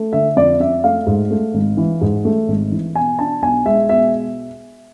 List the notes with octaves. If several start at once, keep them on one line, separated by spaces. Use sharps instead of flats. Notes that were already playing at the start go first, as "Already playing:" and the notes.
Already playing: A3
D3 E5
F2 D5
F2 E5
A3 F5
G#2
A3
G#1
E3
G#2
A3
G#1
E3
B2 G#5
D4 A5
B1 G#5
G#3 E5
B2 E5